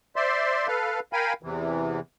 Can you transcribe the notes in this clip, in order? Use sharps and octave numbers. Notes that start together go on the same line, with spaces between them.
C5 D5 E5 C6
A4 B4 F5
A#4 F5 G5 G#5 B5
E2 C3 E3